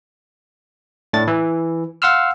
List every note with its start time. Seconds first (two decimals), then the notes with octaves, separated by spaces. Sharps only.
1.13 A2 D4 A6
1.28 E3
2.02 F5 F#5 C6 E6 F6